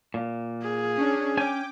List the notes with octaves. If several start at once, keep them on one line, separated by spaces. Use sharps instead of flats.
A#2
G#4
C#4 D4
C#4 G5 G#5 D6